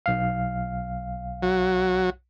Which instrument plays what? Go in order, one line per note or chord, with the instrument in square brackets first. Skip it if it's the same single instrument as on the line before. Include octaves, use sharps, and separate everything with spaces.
[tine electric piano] B1 F5
[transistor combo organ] F#3